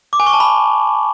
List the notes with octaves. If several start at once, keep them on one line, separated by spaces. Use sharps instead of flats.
D6
G#5
C#6
A5
B5